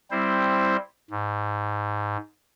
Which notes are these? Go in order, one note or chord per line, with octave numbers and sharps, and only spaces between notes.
G3 C4 E4 C5
G#2